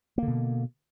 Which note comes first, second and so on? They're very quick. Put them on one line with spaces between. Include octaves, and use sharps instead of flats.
A#3 D3 B2